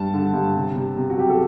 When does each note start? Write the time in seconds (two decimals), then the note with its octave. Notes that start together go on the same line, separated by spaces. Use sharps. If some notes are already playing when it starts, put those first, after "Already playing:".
Already playing: G2 G3 A5
0.14 D3
0.34 G2
0.56 C3
0.76 C3
0.97 C3
1.10 F#4
1.18 F#3 G4
1.29 A4